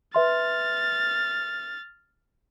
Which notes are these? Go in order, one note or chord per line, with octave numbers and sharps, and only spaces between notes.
B4 E5 C6 F6 A6